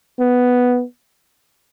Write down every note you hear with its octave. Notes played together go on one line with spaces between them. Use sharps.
B3